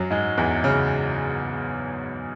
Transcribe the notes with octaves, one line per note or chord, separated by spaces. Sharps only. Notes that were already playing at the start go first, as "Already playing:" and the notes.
Already playing: F#2 F#3
G#2 G#3
E2 E3
C#3